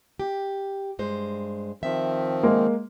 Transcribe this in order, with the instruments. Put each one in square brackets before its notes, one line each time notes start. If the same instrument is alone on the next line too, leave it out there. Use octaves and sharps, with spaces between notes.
[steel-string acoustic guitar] G4
G2 G#3 C5
[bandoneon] D#3 F3 C4 [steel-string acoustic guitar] E5
[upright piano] G#3 A#3